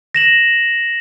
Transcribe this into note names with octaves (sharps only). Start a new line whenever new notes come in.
A#6 E7 F#7